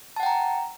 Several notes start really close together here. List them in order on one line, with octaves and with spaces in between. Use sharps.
A5 F#5 G5 A#5